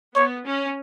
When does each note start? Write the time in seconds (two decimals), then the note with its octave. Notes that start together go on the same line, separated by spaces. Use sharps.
0.15 B3 C#5
0.45 C#4